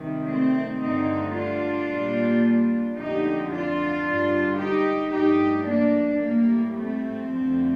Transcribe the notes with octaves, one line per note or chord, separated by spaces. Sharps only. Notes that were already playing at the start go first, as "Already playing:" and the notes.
Already playing: C3 D#3 G3
A3 C4
G2 D3 A3 C4 D#4
D4 F4
A#2 G3
F2 D3 A3 D#4 G4
D4 F4
G2 D3 G3
D#4 G4
G2 F3 A3 D#4 G4
A#3 D4
A2 G3 A#3
A3 C4
F2 D3 F3 A3